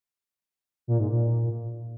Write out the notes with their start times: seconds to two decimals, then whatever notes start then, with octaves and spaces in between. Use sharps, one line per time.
0.88 A#2
0.99 G#2
1.11 A#2